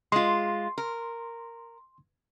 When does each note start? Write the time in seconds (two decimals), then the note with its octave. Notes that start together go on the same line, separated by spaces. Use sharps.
0.12 G#3 F4 C6
0.78 A#4